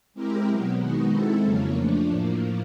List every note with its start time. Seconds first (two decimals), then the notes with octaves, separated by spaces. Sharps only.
0.14 G#3 C4 E4 G4 A#4
0.46 B2 F#3 B3
0.79 D#3 G#3 B3 D#4 F#4
1.11 G#3 C4 E4 A4
1.44 F2 C#3 F#3 A#3 C#4
1.76 F3 A3 D4
2.08 A2 F3 A#3